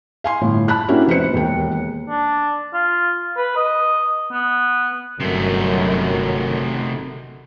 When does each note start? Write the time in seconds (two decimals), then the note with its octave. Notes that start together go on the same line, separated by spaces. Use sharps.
0.24 F5 G#5 C6
0.41 G1 A2
0.68 A5 B5 F#6
0.88 A#3 C#4 D4 E4 F#4 G4
1.07 F1 B4 C5 C#7
1.33 E1 D#2 G5
2.09 D4
2.74 F4
3.37 B4
3.57 D#5
4.32 B3
5.20 G1 F#2 C3 D#3 F#3 A3